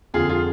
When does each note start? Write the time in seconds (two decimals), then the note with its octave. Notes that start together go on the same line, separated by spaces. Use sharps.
0.14 F2 D3 F4 G#4
0.29 F4 G#4